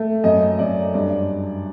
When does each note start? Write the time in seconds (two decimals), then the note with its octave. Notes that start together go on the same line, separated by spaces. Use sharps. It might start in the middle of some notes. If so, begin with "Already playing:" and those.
Already playing: A3
0.24 F#2 D#5
0.59 F#2 D5
0.94 G2 D5